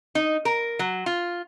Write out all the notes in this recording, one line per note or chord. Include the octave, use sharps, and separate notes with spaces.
D#4
A#4
F#3
F4